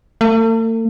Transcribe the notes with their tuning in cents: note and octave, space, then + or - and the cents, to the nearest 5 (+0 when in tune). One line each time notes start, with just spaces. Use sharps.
A3 +45